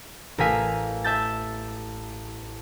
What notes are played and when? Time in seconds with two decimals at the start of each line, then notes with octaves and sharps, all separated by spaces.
0.38 A1 A3 A#4 F5 G#5 B6
1.04 E5 A5 G6 A6